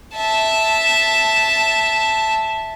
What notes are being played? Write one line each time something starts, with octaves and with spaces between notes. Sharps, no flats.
E5 A5